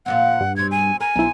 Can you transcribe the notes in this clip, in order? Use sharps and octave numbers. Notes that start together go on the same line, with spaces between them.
A#2 F3 C4 F#5
G2
B2 C4 G#6
G#5
A#4 G#5
B1 D#4 E4 C5